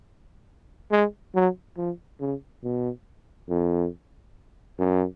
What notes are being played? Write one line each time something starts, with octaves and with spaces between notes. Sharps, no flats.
G#3
F#3
F3
C#3
B2
F2
F#2